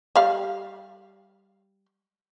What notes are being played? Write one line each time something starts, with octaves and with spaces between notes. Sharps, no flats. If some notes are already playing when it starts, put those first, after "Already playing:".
G3 F5